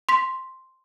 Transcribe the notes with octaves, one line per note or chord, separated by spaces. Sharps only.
C6 B6